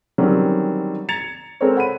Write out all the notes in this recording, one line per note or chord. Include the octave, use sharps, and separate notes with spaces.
D3 D#3 F#3 G3 C4 C#4
A#5 G#6 A6 C#7 F7
G#3 C4 A4 A#4 C5 C#5
F#5 B5 D#7